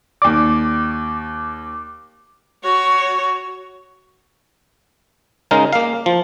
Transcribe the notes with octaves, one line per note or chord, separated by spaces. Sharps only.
D#2 D5 D6
F#4 C#5
C#3 G#3 D#4 A#4
A#3 F5
F3